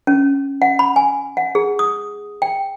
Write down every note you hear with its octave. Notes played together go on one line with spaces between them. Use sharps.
C#4
F#5
B5
G#5
F#5
G#4
D#6
G5